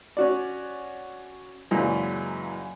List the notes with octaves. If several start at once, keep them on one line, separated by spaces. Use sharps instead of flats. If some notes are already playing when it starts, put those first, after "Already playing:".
C#4 F#4 D5
F#2 A#2 C#3 E3 G#3